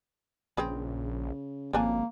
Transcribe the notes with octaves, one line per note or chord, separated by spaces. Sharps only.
A#1 C#3 C4 G#4 B4
G#1 F2 C#3 A#3 D4 G#5